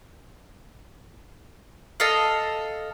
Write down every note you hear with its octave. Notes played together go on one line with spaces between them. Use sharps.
A4 D#5 F5